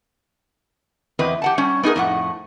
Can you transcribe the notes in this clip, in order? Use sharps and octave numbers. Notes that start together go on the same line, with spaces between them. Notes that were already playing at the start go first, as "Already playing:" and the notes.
E2 C4 B4 D#5
G4 F#5 A5
G3 C#4
B3 D#4 G4 G#4 A#4
F2 A2 F#5